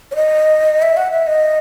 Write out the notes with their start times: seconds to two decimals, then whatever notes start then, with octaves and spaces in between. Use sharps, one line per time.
0.12 C#5
0.16 D#5
0.82 E5
0.97 F#5
1.11 E5
1.27 D#5